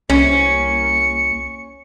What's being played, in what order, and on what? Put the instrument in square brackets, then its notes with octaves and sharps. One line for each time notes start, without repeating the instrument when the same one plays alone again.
[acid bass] C2 [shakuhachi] A#3 [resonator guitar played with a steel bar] C#4 [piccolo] C#7